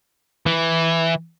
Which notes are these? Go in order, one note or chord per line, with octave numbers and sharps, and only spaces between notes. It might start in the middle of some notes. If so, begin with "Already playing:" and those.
E3